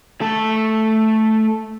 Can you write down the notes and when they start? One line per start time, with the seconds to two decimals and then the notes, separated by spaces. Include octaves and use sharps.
0.21 A3 A4